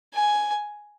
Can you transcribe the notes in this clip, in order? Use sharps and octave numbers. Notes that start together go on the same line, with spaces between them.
G#5